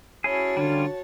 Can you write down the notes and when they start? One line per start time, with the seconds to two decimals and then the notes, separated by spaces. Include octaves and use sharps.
0.24 C#4 E4 F#4 G#4 C#5 A5
0.57 D3 G3 C#4 F4